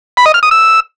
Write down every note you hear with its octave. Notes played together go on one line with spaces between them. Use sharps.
B5
D#5
F6
D#6
E6